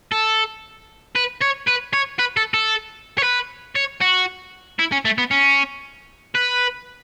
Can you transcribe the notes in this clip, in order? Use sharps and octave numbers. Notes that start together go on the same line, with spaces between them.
A4
B4
C#5
B4
C#5
B4
A4
A4
C#5
B4
C#5
F#4
E4
C#4
A3
B3
C#4
B4